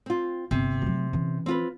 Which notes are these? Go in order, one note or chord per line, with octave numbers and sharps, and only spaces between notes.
C4 F4
G1 C3
F#3 A3
E3 C#4
C4 F4 B4